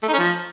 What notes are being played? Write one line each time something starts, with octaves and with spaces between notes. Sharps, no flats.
A3
D#4
C#4
F3